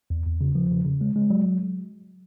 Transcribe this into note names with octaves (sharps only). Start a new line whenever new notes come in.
E2
E2
C#3
F3
C#3
C#3
G#3
G#3
F#3